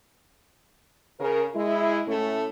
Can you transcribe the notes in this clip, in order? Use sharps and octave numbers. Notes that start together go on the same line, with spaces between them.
C#3 A#4
G#3 E4
A2 A3 C#4